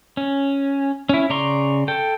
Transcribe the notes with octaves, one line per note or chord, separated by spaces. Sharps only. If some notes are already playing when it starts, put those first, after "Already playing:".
C#4
C#4 E4
C#3 D5 A#5 C6 C#6
A4 G5